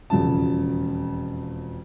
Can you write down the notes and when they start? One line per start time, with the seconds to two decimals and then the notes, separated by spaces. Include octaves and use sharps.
0.10 E1 F2 C#3 A5